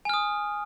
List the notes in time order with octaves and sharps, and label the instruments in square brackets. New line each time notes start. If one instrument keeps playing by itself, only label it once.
[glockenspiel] G#5
F6
D#6